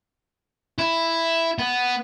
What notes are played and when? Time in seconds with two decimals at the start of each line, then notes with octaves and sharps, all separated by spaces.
0.78 E4
1.59 B3